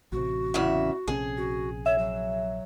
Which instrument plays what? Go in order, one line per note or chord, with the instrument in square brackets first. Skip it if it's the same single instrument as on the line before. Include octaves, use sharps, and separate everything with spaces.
[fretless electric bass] A1 C3 [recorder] F#4
[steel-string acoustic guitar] E2 C#3 E5
[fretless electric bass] A#1 C3 C#4 [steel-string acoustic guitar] G#4
[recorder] F#4
[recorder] C#5 [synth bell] E5
[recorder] F#3